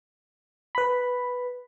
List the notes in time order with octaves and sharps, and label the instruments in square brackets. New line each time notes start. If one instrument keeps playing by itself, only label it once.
[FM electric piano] B4 B5